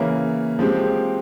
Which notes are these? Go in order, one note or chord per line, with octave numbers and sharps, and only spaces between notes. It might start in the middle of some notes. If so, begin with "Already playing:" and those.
Already playing: C#3 E3 A#3 C#4
F3 G#3 C4 G4